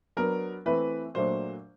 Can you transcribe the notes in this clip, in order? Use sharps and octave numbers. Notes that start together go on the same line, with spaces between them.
F#3 B3 D4 A#4
E3 A3 C4 E4 B4
A#2 F#3 A3 D4 C5